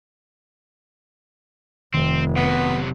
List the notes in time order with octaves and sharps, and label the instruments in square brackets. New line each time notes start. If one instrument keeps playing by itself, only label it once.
[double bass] F1 [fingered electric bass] D#3 [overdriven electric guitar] C4
[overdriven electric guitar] C3 F#3 [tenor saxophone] B3